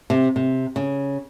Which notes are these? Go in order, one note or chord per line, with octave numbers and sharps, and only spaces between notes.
C3
C3
C#3